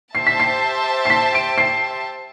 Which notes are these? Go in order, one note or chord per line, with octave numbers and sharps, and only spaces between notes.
G4 C5 E5 A5 C7
B6
C7
C7
B6
D7
C7